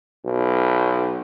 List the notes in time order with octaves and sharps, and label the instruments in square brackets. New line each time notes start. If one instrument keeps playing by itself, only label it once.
[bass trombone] B1